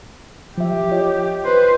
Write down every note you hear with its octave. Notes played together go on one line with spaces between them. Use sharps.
F3 G4 E5
F4 C#5 D#5
B4 C5